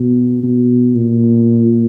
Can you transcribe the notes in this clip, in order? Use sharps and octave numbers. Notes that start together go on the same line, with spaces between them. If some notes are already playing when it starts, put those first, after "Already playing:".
Already playing: B2
B2
A#2